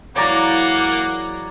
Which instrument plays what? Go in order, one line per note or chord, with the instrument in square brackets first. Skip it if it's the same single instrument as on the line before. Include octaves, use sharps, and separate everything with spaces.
[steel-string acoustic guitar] E3 F#3 G#3 [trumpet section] A#3 [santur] C#5 D5 A#5 [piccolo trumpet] F#5